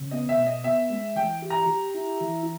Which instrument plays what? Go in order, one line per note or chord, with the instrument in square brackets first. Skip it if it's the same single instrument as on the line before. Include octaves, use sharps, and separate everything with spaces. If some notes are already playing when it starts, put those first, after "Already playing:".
Already playing: [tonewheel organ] C#3
[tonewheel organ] B3 [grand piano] D#5
[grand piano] E5
[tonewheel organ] B2
[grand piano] D#5
[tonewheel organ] B3 [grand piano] E5
[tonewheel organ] G#3
[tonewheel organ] E3 [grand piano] G5
[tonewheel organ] G4
[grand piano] A#5
[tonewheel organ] G4
E4
E3